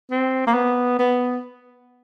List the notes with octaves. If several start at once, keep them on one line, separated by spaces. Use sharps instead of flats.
C4
A#3
B3
B3